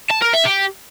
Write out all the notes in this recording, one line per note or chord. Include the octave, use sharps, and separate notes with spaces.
A5
A#4
E5
G4